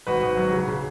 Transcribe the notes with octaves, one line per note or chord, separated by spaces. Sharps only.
G#1 F#4 B4
G#1
F#3
C#3
C#3